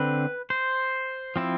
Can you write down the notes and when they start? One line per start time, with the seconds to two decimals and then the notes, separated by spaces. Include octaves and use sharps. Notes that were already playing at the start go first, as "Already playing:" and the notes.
Already playing: D3 C4 B4
0.50 C5
1.36 F3 C4 E4